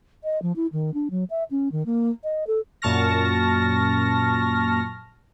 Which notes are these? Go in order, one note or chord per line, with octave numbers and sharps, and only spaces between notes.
D#5
F3
E4
D#3
D4
F#3
E5
C#4
D#3
A#3
D#5
A4
F#2 A#2 A5 C#6 F6 A#6